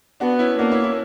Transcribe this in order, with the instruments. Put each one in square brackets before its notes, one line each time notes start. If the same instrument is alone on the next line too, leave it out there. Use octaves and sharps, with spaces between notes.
[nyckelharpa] B3 [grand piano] D4 F#4
[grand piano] C#4 E4
[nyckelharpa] A#3 [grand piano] D4 F#4
[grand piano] C#4 E4
C#4 E4